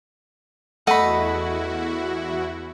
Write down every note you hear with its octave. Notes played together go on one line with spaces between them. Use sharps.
E2 A3 E4 F#4 D#5 F#5 B5